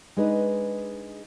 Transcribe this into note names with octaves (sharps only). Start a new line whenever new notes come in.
G#3 D4 D#4 B4